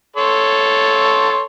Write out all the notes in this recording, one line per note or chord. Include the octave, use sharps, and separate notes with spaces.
A4 C#5 C6